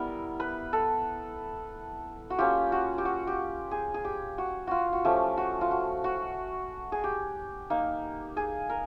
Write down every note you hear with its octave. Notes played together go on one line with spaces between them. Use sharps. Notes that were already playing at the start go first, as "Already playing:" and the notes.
Already playing: G3 B3 E4 A#4
B4
A4
F#4
A#3 C#4 F4 G4
F#4
G4
F#4
G4
G#4
G#4
G4
F#4
F4 F#4
F#4
F3 A3 C#4 G4
F#4
F4
F#4
F#4
G#4
G4
A#3 D#4
G#4
A#4